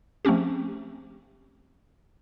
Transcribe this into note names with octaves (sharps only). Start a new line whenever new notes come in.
F3 A3 C4 C#4 G4